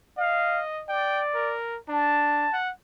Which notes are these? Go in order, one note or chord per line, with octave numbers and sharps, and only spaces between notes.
D#5 F5
D5 G5
A#4
D4 A5
F#5